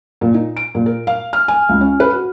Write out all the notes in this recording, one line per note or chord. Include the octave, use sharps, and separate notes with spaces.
A#2
D#4
D7
A#2
A#4
F5
F6
G#5
C#2
C#4
B4
F#4